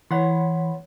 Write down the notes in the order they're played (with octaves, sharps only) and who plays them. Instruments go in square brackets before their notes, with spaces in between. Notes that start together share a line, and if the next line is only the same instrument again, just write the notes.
[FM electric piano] E3 B5 [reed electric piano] C#5 F#5 C6